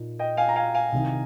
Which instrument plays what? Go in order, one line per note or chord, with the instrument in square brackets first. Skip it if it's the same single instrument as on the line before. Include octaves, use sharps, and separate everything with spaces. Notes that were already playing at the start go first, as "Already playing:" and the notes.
Already playing: [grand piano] A#2 D#4
[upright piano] D#5 G5
F5 G#5
A#5
F5 G#5
F5 G#5
[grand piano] C2 C3 D#3